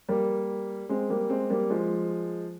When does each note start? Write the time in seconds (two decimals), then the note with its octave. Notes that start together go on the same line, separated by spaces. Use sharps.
0.09 G3 A#3
0.89 G#3 C4
1.10 G3 A#3
1.30 G#3 C4
1.50 G3 A#3
1.70 F3 G#3